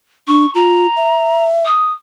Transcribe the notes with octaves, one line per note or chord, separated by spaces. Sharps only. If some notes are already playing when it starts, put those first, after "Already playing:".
D4 C#6
F4 A#5
E5
D#6